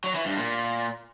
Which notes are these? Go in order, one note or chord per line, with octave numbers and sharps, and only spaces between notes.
F#3
E3
G2
A#2